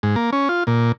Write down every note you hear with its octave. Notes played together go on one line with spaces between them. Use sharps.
G#2
A#3
C#4
F4
A#2